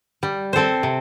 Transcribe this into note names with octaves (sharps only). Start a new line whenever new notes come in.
G3
C4 A4 C5
C3